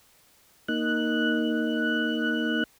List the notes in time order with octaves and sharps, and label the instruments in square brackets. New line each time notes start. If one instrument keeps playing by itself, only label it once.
[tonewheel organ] A#3 D#4 F#6